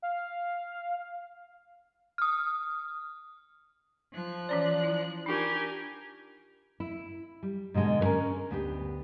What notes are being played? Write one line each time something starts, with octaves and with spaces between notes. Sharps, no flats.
F5
D#6 F6
F3 F#6
E3 C#4 C5 D5
E4
D4 D#4 F4 G4 A#4 G#5
E4
G3
G#2 B2 D3 G#3 D4
B3 C#4 D4 G#4 A#4
D2 B3 D4 G4